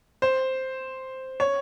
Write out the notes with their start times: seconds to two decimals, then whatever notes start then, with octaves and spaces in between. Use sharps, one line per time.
0.22 C5
1.40 C#5